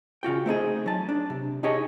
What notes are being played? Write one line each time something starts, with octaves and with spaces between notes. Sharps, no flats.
C#3 F4 F#4 G5
A3 C4 D#4 G#4
F#3 A5
D4
C3
D4 D#4 G4 G#4 C#5 D#5